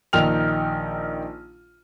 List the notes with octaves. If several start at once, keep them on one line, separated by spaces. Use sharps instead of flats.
A#1 D#3 D#4 G5 F6 F7